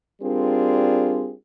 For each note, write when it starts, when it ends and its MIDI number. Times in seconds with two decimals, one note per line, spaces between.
0.22 1.33 55
0.22 1.33 60
0.22 1.33 62
0.22 1.33 65
0.22 1.33 68
0.22 1.33 70